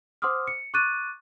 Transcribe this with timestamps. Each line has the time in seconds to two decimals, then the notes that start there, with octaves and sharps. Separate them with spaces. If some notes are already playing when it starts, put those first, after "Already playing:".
0.22 C5 F#5 C6 D6 D#6 F6
0.47 C#7
0.74 C#6 D6 F#6 A6 D#7